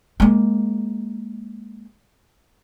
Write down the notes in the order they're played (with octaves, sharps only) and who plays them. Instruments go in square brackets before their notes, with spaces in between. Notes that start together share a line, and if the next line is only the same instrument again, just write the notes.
[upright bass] G#3 A#3